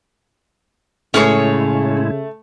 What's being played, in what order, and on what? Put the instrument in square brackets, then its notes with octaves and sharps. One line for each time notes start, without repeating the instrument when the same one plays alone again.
[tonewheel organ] A2 G#3 E4 [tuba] C#3 [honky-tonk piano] A3 [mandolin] C#4 G#4 C#5